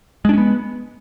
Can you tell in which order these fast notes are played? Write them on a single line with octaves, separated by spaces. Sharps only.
G#3 D4 C#4 B3